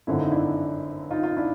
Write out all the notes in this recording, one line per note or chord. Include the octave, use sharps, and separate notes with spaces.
G#1 F#2 D3 F3 E4
D#4
D4 E4
D#4 F4
D#4 F4
D4 E4